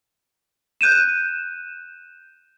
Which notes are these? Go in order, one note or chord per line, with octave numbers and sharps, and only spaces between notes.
F#6 G6 D#7 E7